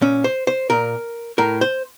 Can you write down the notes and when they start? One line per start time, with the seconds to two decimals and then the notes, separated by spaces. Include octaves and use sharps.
0.02 A#2 C#4
0.24 C5
0.47 C5
0.70 A#2 A#4
1.38 A2 A#4
1.61 C5